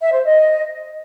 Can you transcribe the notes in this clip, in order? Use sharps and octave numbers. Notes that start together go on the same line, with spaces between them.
E5
C5
D#5